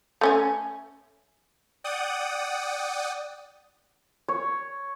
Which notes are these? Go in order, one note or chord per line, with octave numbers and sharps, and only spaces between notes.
A3 C#4 G#5
D5 F#5 G5 D#6
C#5